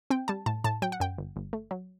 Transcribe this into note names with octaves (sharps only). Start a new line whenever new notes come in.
C4 G5
G3 A5
A2 A5
A2 A5
F#3 G5
F#5
F#2 G5
G1
G1
A3
F#3